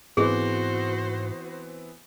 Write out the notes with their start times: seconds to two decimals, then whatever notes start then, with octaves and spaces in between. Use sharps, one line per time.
0.17 G#2 E3 B3 C4 F#4 G#4 C5